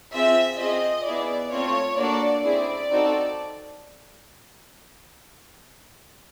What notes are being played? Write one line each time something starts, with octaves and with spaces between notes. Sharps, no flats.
C4 F4 G#4 E5
C4 F4 G#4 D#5
B3 E4 G#4 D5
A3 C4 F4 C#5
A#3 D4 F#4 A4 D5
C4 E4 G#4 D5
C4 D#4 F#4 A4